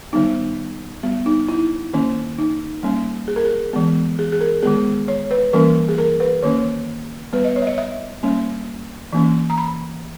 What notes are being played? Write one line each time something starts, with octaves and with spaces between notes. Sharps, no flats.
D#3 G3 B3 D#4
G3 B3
D#4
E4
D#3 A#3 C#4
D#4
G3 A#3 C#4
G#4
A#4
G#4
E3 G#3 B3
G#4
G#4
A#4
D#3 G#3 B3 G#4
C#5
B4
E3 G3 A#3 C#4 A#4
G#4
A#4
B4
D#3 A#3 C#4 C#5
G3 B3 B4
D#5
C#5
E5
D#5
E5
G3 A#3 C#4
E3 A#3 C#4
A#5
B5